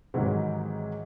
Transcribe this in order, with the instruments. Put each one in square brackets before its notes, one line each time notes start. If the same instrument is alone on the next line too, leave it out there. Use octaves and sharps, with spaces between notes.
[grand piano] G#2 C3 D#3 E3 F#3 G#3